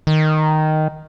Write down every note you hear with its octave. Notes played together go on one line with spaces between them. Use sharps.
D#3